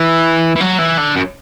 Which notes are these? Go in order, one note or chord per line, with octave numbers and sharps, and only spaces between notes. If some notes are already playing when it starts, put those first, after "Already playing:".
Already playing: E3
E3
F#3
E3
D3
F#2